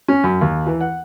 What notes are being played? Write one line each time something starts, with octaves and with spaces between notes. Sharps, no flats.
C#4
F#2
D#2
E3
F#5